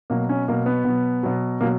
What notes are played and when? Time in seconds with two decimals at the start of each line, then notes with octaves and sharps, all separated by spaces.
0.10 B2 F#3 A#3
0.29 C#4
0.48 B2 F#3 A#3
0.66 B3
0.85 B2 F#3
1.23 B2 F#3
1.61 B2 F#3 A#3